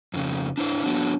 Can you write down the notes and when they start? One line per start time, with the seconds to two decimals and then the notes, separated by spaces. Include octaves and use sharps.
0.14 F2 C#3
0.57 D4 E4 C5
0.84 F#3 B3 D4